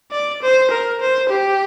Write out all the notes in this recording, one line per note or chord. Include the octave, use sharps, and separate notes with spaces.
D5
C5
A#4
C5
G4